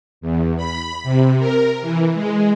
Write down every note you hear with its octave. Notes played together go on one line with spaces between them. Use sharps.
E2
B5
C3
A#4
E3
G#3